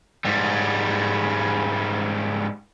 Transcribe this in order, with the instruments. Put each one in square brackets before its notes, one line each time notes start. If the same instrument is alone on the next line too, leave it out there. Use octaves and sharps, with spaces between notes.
[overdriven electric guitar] G#2 G3